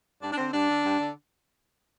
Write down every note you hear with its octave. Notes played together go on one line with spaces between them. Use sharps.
G2 D4
D4
D3 C4
G2 D4
D3
G2
D3